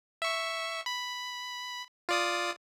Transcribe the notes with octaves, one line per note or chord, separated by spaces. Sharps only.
E5 C#6
B5
F4 D5 D#6